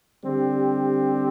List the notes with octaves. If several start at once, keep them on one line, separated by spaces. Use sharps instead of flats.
D3 G3 C4 G4